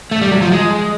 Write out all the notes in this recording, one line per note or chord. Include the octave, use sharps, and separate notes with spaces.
A3
G3
F#3
F3
G#3